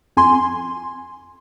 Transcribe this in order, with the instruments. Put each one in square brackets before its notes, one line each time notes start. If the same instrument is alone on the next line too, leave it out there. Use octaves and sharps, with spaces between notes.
[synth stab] F2 G#5 C6